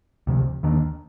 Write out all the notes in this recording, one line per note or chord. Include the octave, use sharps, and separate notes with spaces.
D2 C3 F3
D#2 D#3 A#3 D4